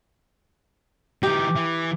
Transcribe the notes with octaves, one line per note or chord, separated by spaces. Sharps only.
E3 D#4 G4
E3